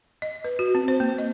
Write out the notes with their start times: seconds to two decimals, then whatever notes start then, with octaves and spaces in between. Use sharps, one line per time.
0.22 D#5
0.44 B4
0.59 F#4
0.75 C4
0.88 C5
1.00 A#3
1.18 D#5